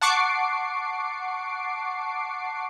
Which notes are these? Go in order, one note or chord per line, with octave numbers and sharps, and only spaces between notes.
F#5 A5 C#6 D6 C7 D7